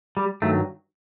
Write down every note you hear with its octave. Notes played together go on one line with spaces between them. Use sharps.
G3
G2 D#3 F#3 A3